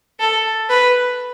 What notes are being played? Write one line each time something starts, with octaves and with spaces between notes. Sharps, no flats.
A4
B4